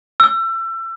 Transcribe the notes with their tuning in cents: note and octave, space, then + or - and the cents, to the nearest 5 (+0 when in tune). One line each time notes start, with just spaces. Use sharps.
E6 +30